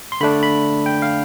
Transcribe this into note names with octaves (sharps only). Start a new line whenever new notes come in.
C6
D3 A3 D4 B5
B5
G5
F5